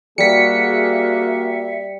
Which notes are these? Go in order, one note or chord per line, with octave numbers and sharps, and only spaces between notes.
G3 A#3 F#4 G#4 E5 B6 C#7